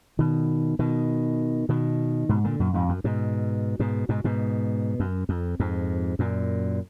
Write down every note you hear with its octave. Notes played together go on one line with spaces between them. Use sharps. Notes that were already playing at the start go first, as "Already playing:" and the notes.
B2 D#3
B2 D#3
B2 D#3
G#2 B2
A#2 D3
F#2 A#2
F2 G#2
F#2
G#2 B2
G#2 B2
G#2 B2
G#2 B2
F#2
F2
F2 G#2
F#2 A#2